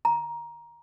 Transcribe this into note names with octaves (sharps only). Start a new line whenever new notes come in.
A#5